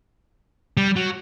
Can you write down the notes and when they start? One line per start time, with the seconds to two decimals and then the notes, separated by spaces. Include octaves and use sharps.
0.77 G3
0.96 F#3